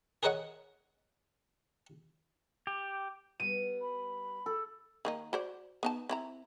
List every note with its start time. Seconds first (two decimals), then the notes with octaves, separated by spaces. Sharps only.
0.23 G#4 A#4 B4 C#5 D#5 F#5
2.67 G4
3.40 G3 B3 B4 D#7
3.81 B5
4.46 A4
5.05 D#3 A#3 D#4
5.33 F#4 C5 D5
5.83 B3 D#4 A5
6.09 C4 E4 A#5